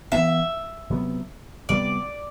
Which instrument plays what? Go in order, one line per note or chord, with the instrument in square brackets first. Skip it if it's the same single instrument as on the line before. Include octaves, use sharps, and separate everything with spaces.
[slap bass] E3 B3 D4 [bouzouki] E5
[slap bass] C3 F#3 B3
[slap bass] C3 G3 B3 [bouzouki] D5